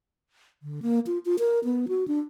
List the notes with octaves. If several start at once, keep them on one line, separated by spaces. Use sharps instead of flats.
D3
A#3
F4
F4
A#4
B3
F#4
D4